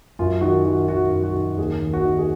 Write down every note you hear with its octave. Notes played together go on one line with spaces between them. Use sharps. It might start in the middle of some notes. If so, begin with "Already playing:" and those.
F#2 F4
D#3 F#4
D#3 F#4
D#3 F#4
F#2
F#4
D#3
D#2 G#4
D#2
F#4
D#3
G#4